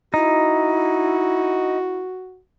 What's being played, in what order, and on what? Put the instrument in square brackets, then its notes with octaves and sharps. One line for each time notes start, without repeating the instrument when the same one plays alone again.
[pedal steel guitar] D#4 [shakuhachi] E4 [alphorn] F#4